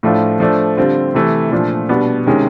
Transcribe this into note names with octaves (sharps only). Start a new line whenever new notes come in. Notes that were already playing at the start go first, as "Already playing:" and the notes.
A2 F3 A3 D4 F4
F3 A3 D4
D3 G3 C4 F4
C3 E3 A3
A#2 F3 A3 D4
B2 G3 B3 D4
C3 D#3 G#3 C#4